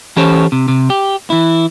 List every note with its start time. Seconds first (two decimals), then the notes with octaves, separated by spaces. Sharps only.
0.16 E3 C#4 G4 A4 C5 C#5
0.52 C3
0.68 C3
0.90 G4
1.30 E3 E4